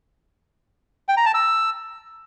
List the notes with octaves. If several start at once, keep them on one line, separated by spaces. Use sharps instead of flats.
G5
A#5
A5
E6